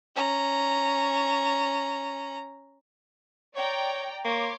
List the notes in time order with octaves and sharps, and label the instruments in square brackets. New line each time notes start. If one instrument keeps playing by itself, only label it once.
[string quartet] C#4 A#5
[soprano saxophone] C#5 [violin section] D5 G5 A#5
[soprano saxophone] A#3 [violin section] C#5 C6 D6